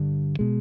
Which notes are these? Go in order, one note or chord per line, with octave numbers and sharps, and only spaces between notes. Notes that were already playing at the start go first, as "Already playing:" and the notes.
Already playing: G2 D3
B2 G#3